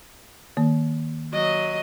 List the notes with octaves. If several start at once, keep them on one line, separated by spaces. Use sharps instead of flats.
D#3 A#3
F#3 D#5